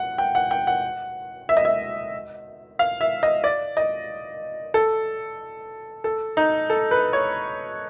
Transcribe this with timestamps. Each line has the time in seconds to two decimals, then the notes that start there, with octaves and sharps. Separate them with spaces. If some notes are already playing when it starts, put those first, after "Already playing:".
Already playing: F#5
0.18 G5
0.35 F#5
0.51 G5
0.67 F#5
1.49 E5
1.57 D#5
1.65 E5
2.79 F5
3.01 E5
3.23 D#5
3.44 D5
3.77 D#5
4.74 A4
6.04 A4
6.37 D#4
6.70 A4
6.91 B4
7.13 C#5